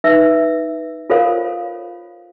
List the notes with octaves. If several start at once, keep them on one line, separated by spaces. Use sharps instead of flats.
D#4 B4 E5 E6
F4 A4 A#4 C5 C#5 F5